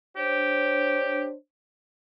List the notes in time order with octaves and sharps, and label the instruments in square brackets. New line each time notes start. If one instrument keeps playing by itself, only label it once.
[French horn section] D4 C5 C#5 [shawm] G4